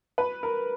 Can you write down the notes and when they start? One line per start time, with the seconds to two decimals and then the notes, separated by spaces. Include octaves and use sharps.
0.18 B4
0.43 A#4